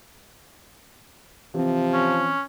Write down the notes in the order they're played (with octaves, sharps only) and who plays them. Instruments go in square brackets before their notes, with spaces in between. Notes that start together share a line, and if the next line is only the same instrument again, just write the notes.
[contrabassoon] C3 [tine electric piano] E3 C4 [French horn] F3
[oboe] C#4